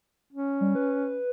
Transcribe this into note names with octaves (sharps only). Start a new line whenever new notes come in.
C#4
G3
B4